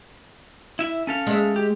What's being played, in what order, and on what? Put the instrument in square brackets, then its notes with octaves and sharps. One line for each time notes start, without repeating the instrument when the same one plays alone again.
[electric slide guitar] E4 E5
C#4 A4 F5
[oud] G#3 E5
[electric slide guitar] G4